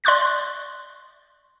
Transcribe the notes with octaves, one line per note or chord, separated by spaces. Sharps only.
D5 C6 C#6 F#6 A6